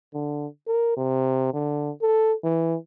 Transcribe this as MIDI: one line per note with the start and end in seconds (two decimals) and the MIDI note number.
0.14 0.47 50
0.67 0.94 70
0.97 1.53 48
1.53 1.91 50
2.02 2.34 69
2.44 2.76 52